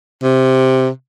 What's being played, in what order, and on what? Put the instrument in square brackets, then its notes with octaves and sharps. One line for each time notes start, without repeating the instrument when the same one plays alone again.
[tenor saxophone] C3